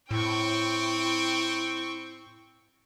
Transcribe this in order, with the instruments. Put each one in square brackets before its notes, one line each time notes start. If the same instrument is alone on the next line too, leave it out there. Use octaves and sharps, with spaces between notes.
[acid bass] A2 [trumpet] C4 [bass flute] E4 [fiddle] G5 C#6